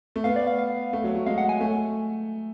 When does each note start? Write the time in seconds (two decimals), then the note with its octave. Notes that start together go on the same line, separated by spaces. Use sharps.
0.16 A3
0.24 B3 F5
0.36 D5
0.47 F5
0.58 F5
0.93 A3
1.04 F#3
1.15 F#3
1.26 G#3 F5
1.38 F#5
1.49 G#5
1.60 A3